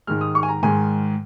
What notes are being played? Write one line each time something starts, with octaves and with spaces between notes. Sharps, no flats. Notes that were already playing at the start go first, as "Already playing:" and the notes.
G#2 D#3 G#3 F6
D#6
C#6
G#5
A#5
G#2 D#3 G#3 G#5